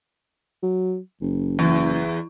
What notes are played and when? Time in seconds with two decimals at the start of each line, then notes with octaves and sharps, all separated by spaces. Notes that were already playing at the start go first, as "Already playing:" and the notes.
0.63 F#3
1.21 F#1
1.59 E2